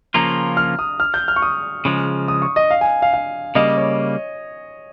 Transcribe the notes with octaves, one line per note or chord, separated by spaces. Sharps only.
C#3 F3 A#3 C#4 F4 A#5
F6
D#6
F6
G6
F6
C#6
D#6
C#3 F3 G#3
D#6
C#6
D#5
F5
G#5
F5
F5
C#3 G3 A#3 D#5
C#5